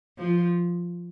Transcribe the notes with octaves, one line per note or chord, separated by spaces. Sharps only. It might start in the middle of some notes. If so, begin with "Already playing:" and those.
F3